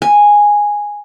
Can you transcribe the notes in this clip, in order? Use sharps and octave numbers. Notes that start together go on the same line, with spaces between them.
G#5